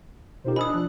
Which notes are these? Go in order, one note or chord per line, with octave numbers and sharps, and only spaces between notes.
B2 D#4 F4 G4 A#4 C5
D4 D#5 G#5 B5 D#6 E6 F#6
F3